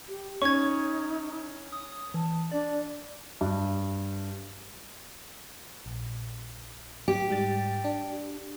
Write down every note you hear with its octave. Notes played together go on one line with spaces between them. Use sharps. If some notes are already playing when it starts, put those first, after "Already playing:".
G4
C#4 D#4 C#6 G#6
D#6
E3 A5
D4 D5
G2
A#1
G4
G#2 G3 A6
D4